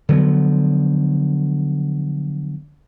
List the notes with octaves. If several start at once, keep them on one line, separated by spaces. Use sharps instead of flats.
D3 F3 F#3 B3